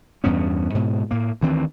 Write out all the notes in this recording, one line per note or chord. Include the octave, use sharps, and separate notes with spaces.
E2 G2 B3 C#4
G#2 B2
A2 A#3
D2 D#3 E3 C4